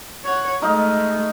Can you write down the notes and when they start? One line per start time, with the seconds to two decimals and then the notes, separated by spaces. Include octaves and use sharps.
0.25 C#5 F#5
0.62 G#3 A3 D#4 D#5 F5